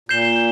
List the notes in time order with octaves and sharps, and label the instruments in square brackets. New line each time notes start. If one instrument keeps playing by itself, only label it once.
[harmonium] A#2 [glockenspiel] G6 C7 E7 G7